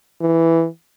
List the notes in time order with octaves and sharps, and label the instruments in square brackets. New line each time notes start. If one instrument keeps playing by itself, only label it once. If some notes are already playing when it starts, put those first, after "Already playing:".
[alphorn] E3